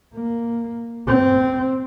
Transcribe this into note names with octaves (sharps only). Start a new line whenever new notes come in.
A#3
C4